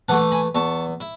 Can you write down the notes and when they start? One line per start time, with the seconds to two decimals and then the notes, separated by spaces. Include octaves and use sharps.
0.08 E3 A3 F#5 A5
0.32 G#5 B5
0.55 E2 A5 C#6
1.00 E4